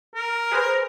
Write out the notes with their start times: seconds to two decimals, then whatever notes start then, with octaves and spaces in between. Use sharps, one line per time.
0.15 A#4
0.52 G#4 B4 C5